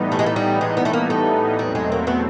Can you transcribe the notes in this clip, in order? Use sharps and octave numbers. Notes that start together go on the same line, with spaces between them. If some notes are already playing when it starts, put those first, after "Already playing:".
Already playing: A2 E3 G3 B3 D#4
A3
G#3
A3
G3
G#3
B3
A3
A#3
A3
E2 B2 F#3 G3 A3 C4
G#3
A#3
B3